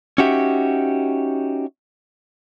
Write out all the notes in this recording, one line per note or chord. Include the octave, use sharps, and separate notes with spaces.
C#4 D#4 F#4 G4 E5